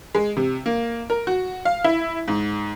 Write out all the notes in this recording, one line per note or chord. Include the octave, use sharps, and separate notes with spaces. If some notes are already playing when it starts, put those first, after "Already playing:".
G#3
C3
A#3
A#4
F#4
F5
E4
G#2